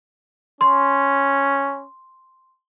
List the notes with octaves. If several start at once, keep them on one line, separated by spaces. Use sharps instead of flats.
C#4 C6